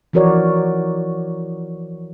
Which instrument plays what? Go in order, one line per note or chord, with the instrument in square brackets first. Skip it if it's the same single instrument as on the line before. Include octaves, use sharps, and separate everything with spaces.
[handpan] E3 F3 F#4 A#4 C#5 D5